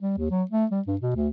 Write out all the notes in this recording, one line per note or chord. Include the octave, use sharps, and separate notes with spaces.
G3
D#2
F#3
A3
G3
G2
B2
D2